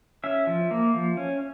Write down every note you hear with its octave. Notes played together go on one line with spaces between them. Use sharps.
C#4 E5
F3
A#3
F3
C#4